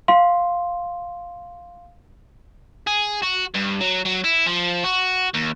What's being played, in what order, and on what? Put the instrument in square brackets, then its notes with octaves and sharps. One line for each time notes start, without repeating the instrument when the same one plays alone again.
[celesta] F5 C6
[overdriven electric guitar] G#4
F#4
G2
F#3
F#3
E4
F3
F#4
D#2